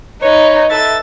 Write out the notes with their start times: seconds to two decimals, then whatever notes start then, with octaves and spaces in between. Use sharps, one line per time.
0.22 D#4 B4 C#5
0.71 A4 B4 E5 A6